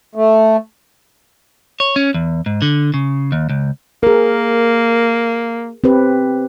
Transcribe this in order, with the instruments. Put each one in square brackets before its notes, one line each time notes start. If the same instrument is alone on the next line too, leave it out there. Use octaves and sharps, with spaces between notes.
[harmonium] A3
[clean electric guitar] C#5
C#4
E2
G#2
D3
C#3
D#2
C#2
[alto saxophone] A#3 [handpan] G#4 A#4
[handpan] C4 G4 B4